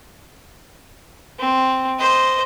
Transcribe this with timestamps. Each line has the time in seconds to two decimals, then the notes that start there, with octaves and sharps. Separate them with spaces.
1.39 C4
1.99 C5 D#5